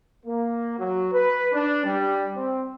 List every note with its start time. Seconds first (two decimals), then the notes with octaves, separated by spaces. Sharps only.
0.26 A#3
0.79 F#3
1.12 B4
1.53 D4
1.85 G3
2.36 C4